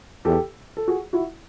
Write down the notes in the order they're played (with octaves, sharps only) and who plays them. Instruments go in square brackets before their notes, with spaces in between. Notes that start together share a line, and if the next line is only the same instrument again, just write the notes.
[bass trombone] E2 [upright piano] G4 A4
[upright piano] A4
F#4 G#4
E4 F#4